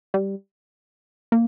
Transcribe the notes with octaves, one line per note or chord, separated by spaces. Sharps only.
G3
A#3